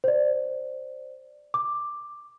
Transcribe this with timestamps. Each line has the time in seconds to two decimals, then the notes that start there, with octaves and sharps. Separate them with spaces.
0.04 C5 D5
1.54 D6